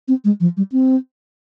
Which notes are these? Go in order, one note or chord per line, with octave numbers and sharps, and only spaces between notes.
C4
G#3
F3
G3
C4